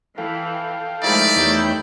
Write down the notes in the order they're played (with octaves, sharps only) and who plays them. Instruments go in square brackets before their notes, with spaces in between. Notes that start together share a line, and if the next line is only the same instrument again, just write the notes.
[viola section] E3 [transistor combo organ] A4 F5 G5
[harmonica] D#3 E4 B5 [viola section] F3 G#3 A3 [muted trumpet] D5
[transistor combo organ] E2 D#4 C#5 [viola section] G3 A3 G5